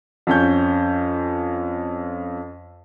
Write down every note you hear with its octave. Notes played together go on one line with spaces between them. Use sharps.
F2 C#4 G6